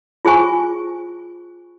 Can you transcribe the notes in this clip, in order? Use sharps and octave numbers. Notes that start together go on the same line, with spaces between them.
F4 G#4 C5 G#5 C#6